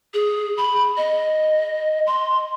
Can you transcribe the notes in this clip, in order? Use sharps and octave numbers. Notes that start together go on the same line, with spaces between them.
G#4
B5
D#5
C6